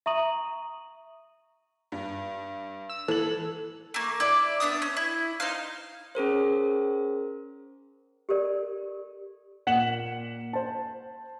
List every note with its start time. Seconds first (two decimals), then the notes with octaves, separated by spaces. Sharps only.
0.06 E5 A#5 C#6 D#6 D#7 F#7
1.92 G2
2.89 E6
3.08 E3 A4 F#7
3.94 A3 A#3
4.20 E4 D5
4.60 B3 D4 E5 D#6
4.82 C#4
4.97 E4
5.40 D#4 C5 F5
6.15 C#4 G#4 A#4 C5
8.29 G4 A4 A#4 D5
9.67 A#2 F#5 B6 E7 F#7
10.53 C5 A5